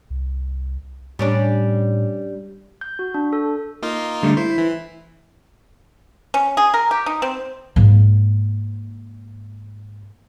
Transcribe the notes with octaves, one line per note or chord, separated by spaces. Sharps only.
C2
A2 G3 C#4 D4
G6
F#4
D4
A4
A#3 D#4 F4
D3 G3 A3
E4 C5
E3
C#4
G#4
A#4
G4
D#4
C4
G#2 A#3